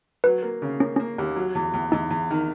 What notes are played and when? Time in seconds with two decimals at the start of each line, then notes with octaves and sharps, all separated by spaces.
0.24 F#3 B4
0.42 A#3
0.62 C#3
0.80 A#3 C#4
0.96 A#3 C#4
1.18 D#2
1.36 F#3
1.55 E2
1.74 E2
1.92 E2 D#4
2.11 E2
2.30 D#3